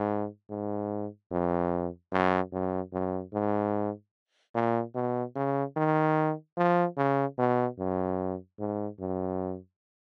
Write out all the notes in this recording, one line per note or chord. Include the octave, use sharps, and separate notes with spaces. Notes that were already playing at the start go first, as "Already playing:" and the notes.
Already playing: G#2
G#2
F2
F#2
F#2
F#2
G#2
A#2
B2
C#3
D#3
F3
C#3
B2
F#2
G#2
F#2